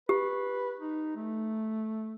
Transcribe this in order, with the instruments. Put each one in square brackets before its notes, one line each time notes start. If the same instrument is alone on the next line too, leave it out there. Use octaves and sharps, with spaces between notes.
[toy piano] G4 [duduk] B4
[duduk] D#4
A3